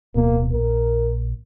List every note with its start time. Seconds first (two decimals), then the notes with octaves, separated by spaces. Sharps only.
0.15 D1 B2 A#3
0.53 A#1 A#4